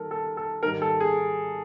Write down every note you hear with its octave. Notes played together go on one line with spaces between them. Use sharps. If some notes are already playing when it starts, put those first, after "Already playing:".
Already playing: D#3 G3 A4 A#4
A4
A4
G#2 D#3 G3 A#4
A4
G#4